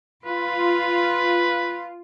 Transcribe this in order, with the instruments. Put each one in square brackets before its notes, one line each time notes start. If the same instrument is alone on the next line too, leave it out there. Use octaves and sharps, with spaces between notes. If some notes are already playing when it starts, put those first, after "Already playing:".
[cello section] F4 [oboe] B4